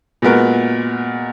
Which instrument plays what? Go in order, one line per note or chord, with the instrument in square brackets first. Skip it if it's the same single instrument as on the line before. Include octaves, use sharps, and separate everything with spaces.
[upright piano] A#2 G#3 B3 F#4 A#4